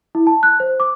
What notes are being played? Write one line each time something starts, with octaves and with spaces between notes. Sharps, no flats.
E4
A5
F#6
C5
D6